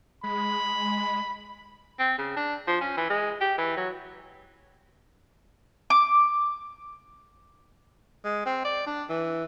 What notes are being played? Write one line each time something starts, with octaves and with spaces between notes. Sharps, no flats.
G#3 B5
C4
C#3
D4
F3
C#4
E3
G#3
G4
E3
F#3
D6
G#3
C4
D5
D4
E3